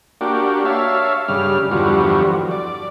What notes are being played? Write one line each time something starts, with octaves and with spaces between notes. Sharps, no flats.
A#3 D4 F#4 G4
C#5 E5 F5 A5
G2 C#3 G3 F6
E2 G2 D3 F3 G3 F#4
D5